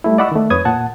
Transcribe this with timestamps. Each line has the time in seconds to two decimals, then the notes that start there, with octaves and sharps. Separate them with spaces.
0.04 G3 A3 E4
0.18 D5 D#5 F#5 B5 C#6 E6
0.32 D#3 A3
0.50 F2 B4 C#5 D#6 G#6
0.65 A#2 F#5 A5